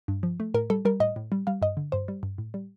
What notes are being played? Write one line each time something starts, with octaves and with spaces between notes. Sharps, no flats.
G2
F3
A3
A2 A#4
G3 A4
G3 A#4
A2 D#5
A2
G3
G3 F5
G2 D#5
D3
G2 C5
G3
G2
A2
G3